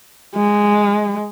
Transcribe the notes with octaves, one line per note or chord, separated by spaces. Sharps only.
G#3